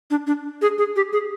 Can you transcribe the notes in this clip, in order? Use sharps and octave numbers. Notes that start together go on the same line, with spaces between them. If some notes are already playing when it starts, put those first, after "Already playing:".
D4
D4
G#4
G#4
G4
G#4